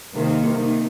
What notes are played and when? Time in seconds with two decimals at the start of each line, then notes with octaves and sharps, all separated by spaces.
0.15 C3 D#3 A#3
0.43 A#3
0.56 C3 D#3